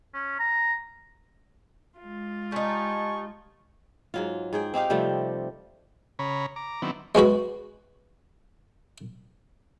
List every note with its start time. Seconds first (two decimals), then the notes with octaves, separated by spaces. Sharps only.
0.14 C#4
0.39 A#5
1.99 G#3 F4
2.52 G3 D#4 G#5 A5 C#6
4.14 G#2 F#3 F4
4.53 G#2 G#4 G5
4.74 C4 D#4 G4 F5
4.90 C3 F3 G3 A3
6.19 C#3 C#5 A#5 B5
6.56 A#5 D6
6.82 D#3 F#3 B3 C4 D4 E4
7.15 G#3 B3 F#4 B4